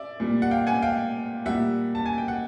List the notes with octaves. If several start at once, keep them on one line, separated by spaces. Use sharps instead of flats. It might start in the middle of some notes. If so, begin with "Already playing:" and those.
Already playing: D5 E5
A#2 G3
F#5
F5 G5
F#5 G#5
F5 G5
A#2 G3 E5 F#5
A5
G#5
G5
F#5